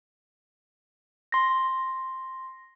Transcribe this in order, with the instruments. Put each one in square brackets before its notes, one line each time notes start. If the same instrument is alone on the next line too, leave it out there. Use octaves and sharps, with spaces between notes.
[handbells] C6 A#6